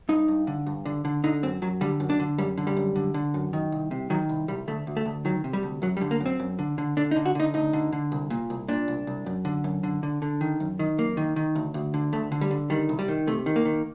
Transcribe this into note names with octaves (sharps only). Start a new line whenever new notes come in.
G2 D#4
G2
D3
G2
D3
D3
D3 D#4
F#2 C4
F#2 F#3
D3 G3
F#2
D4
D3
F#2 G3
D3
G3
F#2
D3
D3
F#2
D#3
C2
C3
D#3 F#3
C2
C2 G3
D2 A3
D2
A3
D2
D#3 F#3
C3
G3
D2
F#2 F#3
G3
D3
A#3
F#2
C4
F#2
D3
D3
D3 D4
D#4
D3
F#4
D3 D#4
D2 D#4
D3
D3
C2
A#2
C2
A#2 D4
C2
C2
F#2
D3
F#2
D3
D3
D3
D#3
F#2
D#3
F#2 A#3
D#3
D#3
D2
D2
D3
D2 A3
D3
G3
D3
D#3 G3
C2
G3
D#3
C3 A3
D#3
A#3
D#3